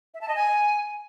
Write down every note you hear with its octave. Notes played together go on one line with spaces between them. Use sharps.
E5
A5
D#5
G#5